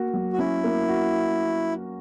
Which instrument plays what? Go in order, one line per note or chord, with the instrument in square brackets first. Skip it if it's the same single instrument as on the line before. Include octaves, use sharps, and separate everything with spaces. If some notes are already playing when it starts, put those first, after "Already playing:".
Already playing: [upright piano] A#3 F#4
F#3
[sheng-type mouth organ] F#4
[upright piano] C#4 [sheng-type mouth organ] E4
[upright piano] A#3
F#4